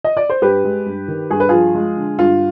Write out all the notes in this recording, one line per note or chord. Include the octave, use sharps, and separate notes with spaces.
D#5
D5
C5
G2 G4 B4
G#3
G2
D#3
G2 G#4
B4
F3 F4 G#4
G#3
D3
G2 F4